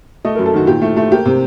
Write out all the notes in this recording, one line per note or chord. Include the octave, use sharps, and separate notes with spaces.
A3 D#5
A#4
F#2
A4
D#3 F#4
A#2 G4
A3
A3
A#3 G4
C3